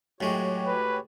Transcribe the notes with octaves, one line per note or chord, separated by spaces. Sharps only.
A2 F#3 G#3 F#4 G4 C#5
B4